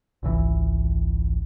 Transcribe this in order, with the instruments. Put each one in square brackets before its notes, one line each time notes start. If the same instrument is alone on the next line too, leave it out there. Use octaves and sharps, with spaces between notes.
[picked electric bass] G#1 C#2 E3